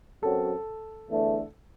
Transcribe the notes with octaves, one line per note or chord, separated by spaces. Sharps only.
F#2 F#3 C4 F#4 A4
E2 D3 A3